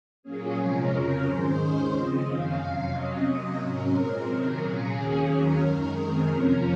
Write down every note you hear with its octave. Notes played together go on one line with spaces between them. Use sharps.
A#2 F#3 A#3 C#4 G#4
C3 F3 G#3 C#4 A#4
F2 C#3 F#3 C#4
G#2 D#3 G#3 C5
D#2 D#3 G#3 C#4
C#3 F3 C4 D#5
F#2 D#3 A#3 C#4 F5
F2 C3 F#3
C3 F#3 C#4 D#5
C3 F#3 A#3 D#5
G#2 F#3 C#4 A#4
A#2 G#3 C4 A#4
C3 D#3 F#3
A#2 F#3 A#3 C#4 G#4
D#2 D#3 A#3 C#4
D#2 D#3 F#3 C#4 A#4
F#2 D#3 G#3
F#2 D#3 G#3 C4
F2 C3 F3 A#3 C#4